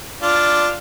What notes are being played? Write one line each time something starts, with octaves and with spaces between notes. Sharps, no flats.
D4 F4